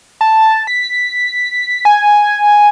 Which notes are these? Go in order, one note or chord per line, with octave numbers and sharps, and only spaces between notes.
A5
B6
G#5